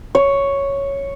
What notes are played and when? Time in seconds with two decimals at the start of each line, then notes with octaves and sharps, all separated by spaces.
0.15 C#5